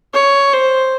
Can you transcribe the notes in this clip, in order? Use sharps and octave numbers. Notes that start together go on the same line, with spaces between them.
C#5
C5